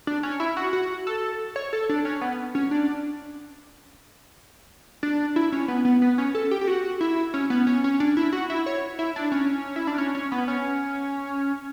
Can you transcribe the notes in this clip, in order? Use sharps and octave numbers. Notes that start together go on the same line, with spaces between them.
D4
C#4
E4
F#4
F#4
A4
C#5
A4
D4
C#4
B3
C#4
D4
D4
E4
C#4
B3
B3
B3
C#4
A4
G4
G4
F#4
E4
C#4
B3
C#4
C#4
D4
E4
F#4
E4
C#5
E4
D4
C#4
E4
D4
C#4
C#4
B3
C#4